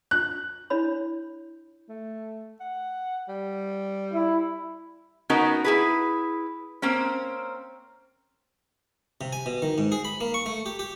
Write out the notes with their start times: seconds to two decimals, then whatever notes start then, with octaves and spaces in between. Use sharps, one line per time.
0.11 F#6
0.70 D4 E4 C#5 B5
1.89 A3
2.60 F#5
3.28 G3
4.13 E4
5.30 B3 C#4 D#4 F#4 A#4
5.64 E4 G#4 B4
6.82 A#3 C4 C#4
9.21 C3
9.33 G#5
9.46 B2
9.62 D#3
9.78 G#2
9.92 G#4
10.05 B5
10.21 A#3
10.34 C#6
10.46 A3
10.66 G4
10.79 G4